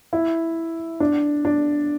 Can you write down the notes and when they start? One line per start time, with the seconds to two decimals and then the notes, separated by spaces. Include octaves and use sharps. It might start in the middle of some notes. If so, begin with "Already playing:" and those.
0.13 E4
1.00 D4
1.45 D4